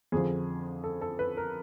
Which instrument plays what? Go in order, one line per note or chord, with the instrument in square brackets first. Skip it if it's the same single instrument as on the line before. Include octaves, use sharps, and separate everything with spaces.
[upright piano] F2 D3 F3 G#4
A4
A4
B4
A#4